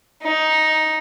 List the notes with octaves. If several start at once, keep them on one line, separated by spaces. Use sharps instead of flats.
D#4